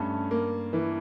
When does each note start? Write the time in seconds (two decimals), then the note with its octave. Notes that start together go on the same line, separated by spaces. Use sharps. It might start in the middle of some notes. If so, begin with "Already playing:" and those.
Already playing: G2 A3 C#4
0.31 A#3
0.73 E3